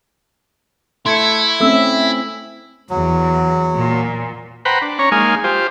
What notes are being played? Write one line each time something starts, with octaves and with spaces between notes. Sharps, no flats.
A3 E4 C6 G#6 C#7
A3 C4 C#4 A4 E5 E6
E2 F#3
A#2
B4 C5 F#5 G5 A#5 B5
D4
C#4 C#5 A#5
G#3 A#3 D#4 F5 G#5
F4 G4 C5